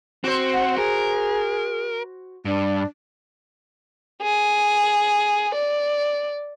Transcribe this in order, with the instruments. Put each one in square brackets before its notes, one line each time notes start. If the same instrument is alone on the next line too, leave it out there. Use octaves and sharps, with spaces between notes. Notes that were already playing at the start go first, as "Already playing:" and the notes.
[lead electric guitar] C4 [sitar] F#4 C5
[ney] F#5
[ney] G#4 [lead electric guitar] A#4
[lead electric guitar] G2 [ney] D4
[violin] G#4
D5